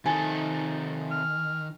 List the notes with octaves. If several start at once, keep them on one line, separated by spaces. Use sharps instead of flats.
C3 D#3 D#4 A4 G#5
F6